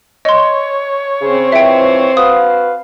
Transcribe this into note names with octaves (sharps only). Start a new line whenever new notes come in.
C#5 D#5 C6
C#3 C4 C5
G#2 E3 F3 E5 G5
F#4 B4 F5 D#6